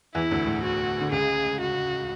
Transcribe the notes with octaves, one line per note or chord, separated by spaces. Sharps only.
E2 E3 E4
D2 D3
A2
F#4
D3
C#2 C#3 G#4
F#4